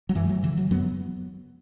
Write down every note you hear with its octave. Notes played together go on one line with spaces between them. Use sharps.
F#3
F#2 E3
A3
F#3
C#3 E3
F#3
F#2 F#3 B3